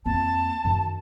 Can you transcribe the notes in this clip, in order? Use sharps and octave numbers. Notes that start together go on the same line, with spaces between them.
F2 A#3 A5
F#2 D#3